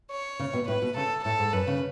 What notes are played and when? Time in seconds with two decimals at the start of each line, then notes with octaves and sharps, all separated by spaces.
0.11 C#5
0.39 C#3
0.53 B2
0.68 A2 B4
0.82 B2
0.96 C#3 A4
1.24 A2 A4
1.39 G#2
1.53 F#2 B4
1.67 C#3